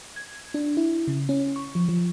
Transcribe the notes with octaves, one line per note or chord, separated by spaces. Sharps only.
G#6
D4
E4
C#3
C#4
C#6
F3
F3